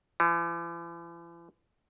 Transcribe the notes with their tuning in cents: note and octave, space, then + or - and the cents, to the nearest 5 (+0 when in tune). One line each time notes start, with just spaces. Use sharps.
E3 +45